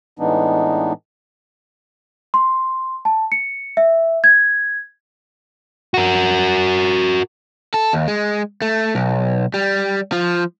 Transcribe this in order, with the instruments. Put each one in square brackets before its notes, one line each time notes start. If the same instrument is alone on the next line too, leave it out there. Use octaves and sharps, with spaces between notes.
[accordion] A2 E3 G#3 B3 D4 D#4
[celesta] C6
A5
C#7
E5
G#6
[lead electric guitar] F#4 A#4
[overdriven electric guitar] A4
D#2
G#3
A3
B1
G3
F3